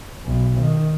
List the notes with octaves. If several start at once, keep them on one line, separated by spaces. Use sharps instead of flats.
B1
D#3